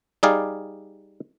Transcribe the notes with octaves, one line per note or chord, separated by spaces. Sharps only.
G3 D#4 G#4 D5 F5